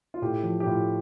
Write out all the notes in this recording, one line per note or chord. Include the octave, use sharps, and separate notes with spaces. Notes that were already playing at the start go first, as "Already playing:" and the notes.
F4
A2 G4
F3
G4
A2 F4